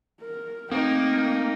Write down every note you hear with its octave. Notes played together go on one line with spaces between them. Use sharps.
A#4
A3 A#3 C4 D#4 G5